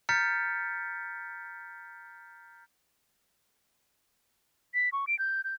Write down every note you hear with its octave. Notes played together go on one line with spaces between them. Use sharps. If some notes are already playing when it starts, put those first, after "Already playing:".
A#5 F6 G6 A6 B6 C#7
B6
C#6
D7
G6
G6